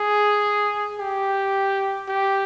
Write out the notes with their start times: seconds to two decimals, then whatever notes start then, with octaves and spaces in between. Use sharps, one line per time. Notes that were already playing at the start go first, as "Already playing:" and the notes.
Already playing: G#4
0.99 G4
2.08 G4